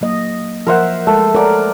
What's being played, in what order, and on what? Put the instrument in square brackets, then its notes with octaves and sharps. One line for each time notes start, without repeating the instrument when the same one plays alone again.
[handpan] F#3 A#3 D#5
[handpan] F3 E5 [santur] A#4 C5 F#5
[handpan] G#3 [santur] A3
[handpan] A4 A#4 C#5 [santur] D5 F#5